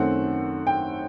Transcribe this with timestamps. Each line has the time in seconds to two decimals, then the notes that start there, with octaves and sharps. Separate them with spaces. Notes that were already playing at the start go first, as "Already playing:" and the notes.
Already playing: F#2 D#3 A3 C4 F#5
0.67 G5